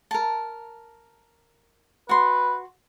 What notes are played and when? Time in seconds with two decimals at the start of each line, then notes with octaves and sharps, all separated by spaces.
0.11 A#4 A5
2.09 F#4 B4 C6